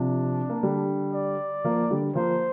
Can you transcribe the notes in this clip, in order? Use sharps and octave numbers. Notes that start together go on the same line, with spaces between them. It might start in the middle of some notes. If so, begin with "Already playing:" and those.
Already playing: C3 F3 D4
A#3
D3 G3
D5
F3 A#3
D3 G3
F3 A#3 C5